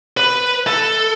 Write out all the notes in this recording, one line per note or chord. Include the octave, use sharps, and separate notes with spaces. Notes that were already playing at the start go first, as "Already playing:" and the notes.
B4
A4